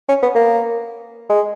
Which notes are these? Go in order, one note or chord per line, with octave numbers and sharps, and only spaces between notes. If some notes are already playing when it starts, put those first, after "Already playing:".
C#4
B3
A#3
G#3